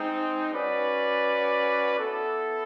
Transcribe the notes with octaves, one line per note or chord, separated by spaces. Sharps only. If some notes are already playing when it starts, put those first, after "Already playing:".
Already playing: G#3 C4 D#4
C#4 F#4 B4 D5
B3 E4 A4